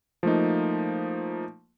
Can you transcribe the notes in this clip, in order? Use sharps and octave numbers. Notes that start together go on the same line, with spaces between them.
F3 A3 A#3 D#4